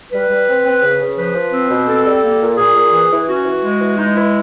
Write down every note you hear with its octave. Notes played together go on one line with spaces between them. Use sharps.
G3 B4
G3
C4
C4
C#3
C#3
F3 B4
F3
C4
B2
C4 A4
G3
A#3
A#2
A#2 G#4
A#2
E3
E3
C#4 F#4
E3
G#3
E3
G#3 D#4
E3 E4